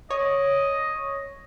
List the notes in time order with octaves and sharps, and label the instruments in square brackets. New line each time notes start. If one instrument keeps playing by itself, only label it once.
[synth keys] C#5 [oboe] D#5